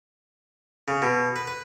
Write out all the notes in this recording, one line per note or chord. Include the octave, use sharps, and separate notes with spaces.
C#3
B2
B4
B4